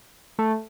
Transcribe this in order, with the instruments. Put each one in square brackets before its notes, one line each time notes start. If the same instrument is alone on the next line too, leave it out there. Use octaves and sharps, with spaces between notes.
[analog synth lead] A3